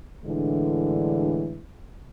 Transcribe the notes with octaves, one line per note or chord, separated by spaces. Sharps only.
A2 D3 E3 G#3 D4